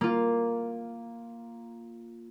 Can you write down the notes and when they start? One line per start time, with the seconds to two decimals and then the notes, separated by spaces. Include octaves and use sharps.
0.01 A#3 F4